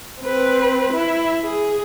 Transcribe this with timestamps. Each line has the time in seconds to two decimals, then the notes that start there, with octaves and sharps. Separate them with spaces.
0.21 C4 B4
0.94 E4
1.43 G#4